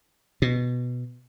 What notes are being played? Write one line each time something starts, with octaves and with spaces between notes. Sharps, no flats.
B2